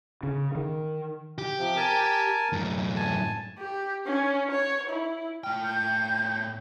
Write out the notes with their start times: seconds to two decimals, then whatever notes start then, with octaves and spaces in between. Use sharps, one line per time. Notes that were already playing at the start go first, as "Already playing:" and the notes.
0.23 C#3
0.55 D#3
1.38 G4
1.58 C3 F3
1.77 A#4 G#5 A5
2.53 F#2 A2
2.96 G#5 A5
3.59 G4
4.07 C#4
4.51 C#5
4.89 E4
5.44 A2 G5 F6
5.63 G6